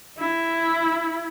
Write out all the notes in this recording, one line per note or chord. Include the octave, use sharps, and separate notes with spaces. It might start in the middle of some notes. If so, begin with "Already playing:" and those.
E4